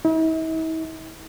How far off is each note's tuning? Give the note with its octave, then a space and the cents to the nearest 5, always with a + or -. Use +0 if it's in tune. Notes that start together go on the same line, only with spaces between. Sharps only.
E4 -45